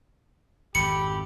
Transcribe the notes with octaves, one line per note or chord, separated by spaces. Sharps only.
G#1 F2 G4 B5 C#7